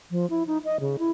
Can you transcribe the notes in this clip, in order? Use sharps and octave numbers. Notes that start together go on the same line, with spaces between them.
F3
E4
D#4
D#5
C#3
E4